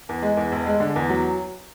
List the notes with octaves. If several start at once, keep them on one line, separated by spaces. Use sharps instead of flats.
E2
G#3
E2
E1
G#3
D3
E2
F#3